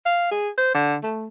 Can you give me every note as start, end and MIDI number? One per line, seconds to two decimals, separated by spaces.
0.06 0.28 77
0.31 0.49 68
0.57 0.72 72
0.74 0.96 50
1.03 1.26 57